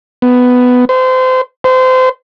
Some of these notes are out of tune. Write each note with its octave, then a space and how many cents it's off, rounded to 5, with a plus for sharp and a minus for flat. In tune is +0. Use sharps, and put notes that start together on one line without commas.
B3 +10
C5 -30
C5 -30